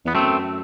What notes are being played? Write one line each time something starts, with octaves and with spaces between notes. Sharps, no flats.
E2 B3
F#2 A3 C4